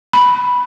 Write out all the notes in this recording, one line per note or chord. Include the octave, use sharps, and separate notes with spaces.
B5